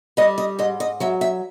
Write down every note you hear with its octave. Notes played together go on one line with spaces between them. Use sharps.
G3 D#5
D#5
G#2 D#5
D#5
F#3 E5
E5